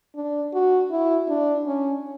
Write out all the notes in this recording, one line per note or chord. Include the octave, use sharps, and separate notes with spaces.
D4
F#4
E4
D4
C#4